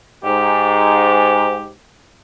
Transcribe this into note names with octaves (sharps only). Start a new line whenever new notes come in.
G#2 G4